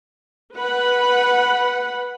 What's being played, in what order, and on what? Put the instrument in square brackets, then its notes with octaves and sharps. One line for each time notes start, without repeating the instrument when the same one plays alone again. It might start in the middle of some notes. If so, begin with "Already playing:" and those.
[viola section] B4 F#5 B5